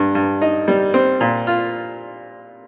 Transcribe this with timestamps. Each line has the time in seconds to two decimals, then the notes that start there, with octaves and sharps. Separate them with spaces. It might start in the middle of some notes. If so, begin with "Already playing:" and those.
Already playing: G2
0.15 G2
0.41 D#4
0.68 G3
0.94 C4
1.21 A#2
1.47 F4